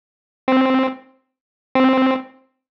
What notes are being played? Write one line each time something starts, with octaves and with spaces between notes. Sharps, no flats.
C4
C4